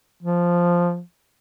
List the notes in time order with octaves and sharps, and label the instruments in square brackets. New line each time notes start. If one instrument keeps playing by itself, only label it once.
[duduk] F3